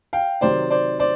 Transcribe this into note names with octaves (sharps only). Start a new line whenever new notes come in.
F5 G5
C3 D#3 F#3 C5 D5
C5 D5
C5 D5